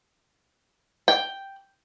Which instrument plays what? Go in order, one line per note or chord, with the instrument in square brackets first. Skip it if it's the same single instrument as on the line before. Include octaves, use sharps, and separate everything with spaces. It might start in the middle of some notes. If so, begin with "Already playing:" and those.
[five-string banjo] G5